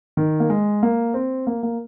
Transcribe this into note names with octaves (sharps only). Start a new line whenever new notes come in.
D#3
A#3
G#3
A#3
C4
A#3
A#3